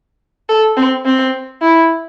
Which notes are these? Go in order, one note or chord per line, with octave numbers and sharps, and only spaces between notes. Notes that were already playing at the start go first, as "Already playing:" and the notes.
A4
C4
C4
E4